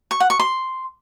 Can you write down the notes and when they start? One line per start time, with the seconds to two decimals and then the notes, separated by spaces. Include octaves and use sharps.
0.11 C#6
0.20 F#5
0.30 C#6
0.40 C6